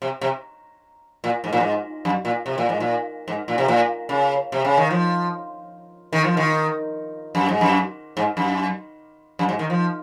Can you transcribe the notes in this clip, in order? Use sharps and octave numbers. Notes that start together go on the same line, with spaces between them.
C3
C3
A#2
G#2
A#2
G#2
F#2
A#2
C3
A#2
G#2
A#2
G#2
A#2
C3
A#2
C#3
C3
C#3
D#3
F3
D#3
F3
D#3
F#2
G#2
F#2
G#2
F#2
F#2
G#2
D#3
F3